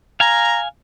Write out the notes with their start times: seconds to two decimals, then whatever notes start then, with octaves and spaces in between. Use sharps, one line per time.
0.20 F5 G#5 A#5